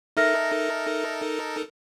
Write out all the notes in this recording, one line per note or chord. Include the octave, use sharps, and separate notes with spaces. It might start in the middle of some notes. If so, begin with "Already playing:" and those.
D#4 A4 A#4 E5 F6 A#6